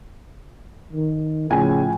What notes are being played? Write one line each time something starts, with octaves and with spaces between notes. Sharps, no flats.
D#3
A2 C#3 F3 G#5